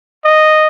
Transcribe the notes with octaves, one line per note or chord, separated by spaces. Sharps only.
D#5